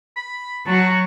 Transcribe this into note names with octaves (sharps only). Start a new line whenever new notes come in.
B5
F#3 F#4 A5